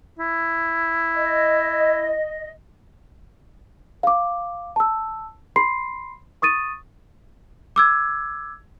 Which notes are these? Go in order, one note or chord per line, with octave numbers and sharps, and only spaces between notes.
E4
D#5
F5 D6
A5 E6
B5 C6 C7
C#6 D#6 A6 D#7
D6 E6 G#6